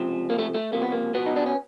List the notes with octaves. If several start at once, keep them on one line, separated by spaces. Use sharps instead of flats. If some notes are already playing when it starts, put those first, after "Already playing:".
Already playing: C#2 C3 F3
A#3
A3
A3
C#2 C3 F3 A#3
B3
A#3
B2 B3
D#4
D4
C#4